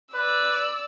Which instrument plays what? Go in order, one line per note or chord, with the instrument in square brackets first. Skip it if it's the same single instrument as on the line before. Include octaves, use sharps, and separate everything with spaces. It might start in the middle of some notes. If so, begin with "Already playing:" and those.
[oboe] B4 [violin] D5 E6